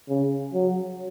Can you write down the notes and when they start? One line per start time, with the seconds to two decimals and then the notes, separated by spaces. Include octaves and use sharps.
0.09 C#3
0.53 F#3